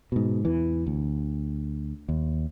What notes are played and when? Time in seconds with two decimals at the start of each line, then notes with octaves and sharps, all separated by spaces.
0.12 G#2 B2
0.45 E2 E3
0.86 D2
2.09 D#2